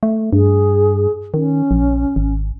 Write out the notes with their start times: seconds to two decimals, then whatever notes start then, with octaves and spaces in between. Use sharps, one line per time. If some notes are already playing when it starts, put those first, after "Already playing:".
0.03 A3
0.33 G2 G#4
1.34 D#3 C#4
1.71 A#1
2.16 G#1